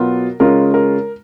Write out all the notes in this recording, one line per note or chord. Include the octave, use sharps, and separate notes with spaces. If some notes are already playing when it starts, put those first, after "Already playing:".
Already playing: B2 F#3 B3 F4 A#4
C#3 G#3 C#4 F4 A#4
A#4